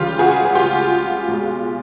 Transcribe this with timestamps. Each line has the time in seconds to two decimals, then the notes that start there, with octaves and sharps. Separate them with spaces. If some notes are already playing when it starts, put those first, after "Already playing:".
Already playing: C#2 C#3 E3 G3 F4 G4
0.19 F#4 G#4
0.45 G#4
0.55 F4 G4
1.28 B1 B2 G#3